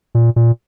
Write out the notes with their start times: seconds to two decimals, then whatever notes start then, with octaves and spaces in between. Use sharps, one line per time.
0.15 A#2
0.36 A#2